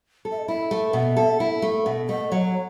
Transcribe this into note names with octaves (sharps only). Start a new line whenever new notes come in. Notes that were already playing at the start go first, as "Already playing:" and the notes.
A4
E5
D#5
E4 E5
A3
B2
A4
E4
A3
B2
A3 D#5
F#3 C#5